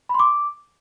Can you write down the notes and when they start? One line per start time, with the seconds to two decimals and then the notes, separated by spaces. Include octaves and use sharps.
0.09 B5
0.14 C6
0.19 D6